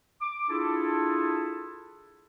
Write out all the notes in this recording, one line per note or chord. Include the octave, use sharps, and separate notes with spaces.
D6
D4 E4 F4 G#4 A4